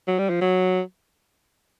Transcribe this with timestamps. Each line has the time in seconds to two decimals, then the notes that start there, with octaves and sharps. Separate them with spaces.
0.08 F#3
0.19 G3
0.30 F3
0.41 F#3